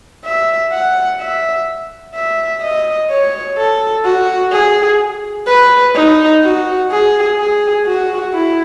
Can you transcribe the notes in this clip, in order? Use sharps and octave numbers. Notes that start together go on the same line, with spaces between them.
E5
F#5
E5
E5
D#5
C#5
A4
F#4
G#4
B4
D#4
F#4
G#4
G#4
F#4
E4